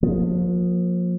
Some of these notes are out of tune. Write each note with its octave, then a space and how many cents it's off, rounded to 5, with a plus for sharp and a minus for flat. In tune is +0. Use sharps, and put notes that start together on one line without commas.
F3 +30 A#3 +0